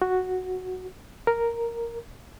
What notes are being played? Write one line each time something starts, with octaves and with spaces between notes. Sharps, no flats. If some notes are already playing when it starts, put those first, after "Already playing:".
F#4
A#4